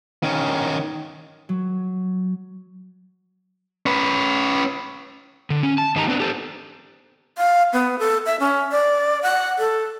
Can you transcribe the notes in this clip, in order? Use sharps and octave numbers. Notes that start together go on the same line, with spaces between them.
D#3 C#4
F#3
C#4 B4
D3
C#4
A5
G#2 D#3 D#4 G4 G#4 A#5
B3 C4 D4 A#4 B4
G4 A4 C5
F5
B3
A4
E5
C#4
D5
F#5
A4